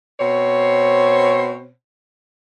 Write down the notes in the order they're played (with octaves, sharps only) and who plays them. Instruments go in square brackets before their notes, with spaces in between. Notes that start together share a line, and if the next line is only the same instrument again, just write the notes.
[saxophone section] B2 C4 C5 C#5